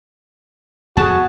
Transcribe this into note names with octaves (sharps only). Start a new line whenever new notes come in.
F2 B3 F#4 G#4 A5